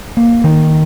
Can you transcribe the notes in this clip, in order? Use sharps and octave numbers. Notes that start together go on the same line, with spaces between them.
A#3
D#3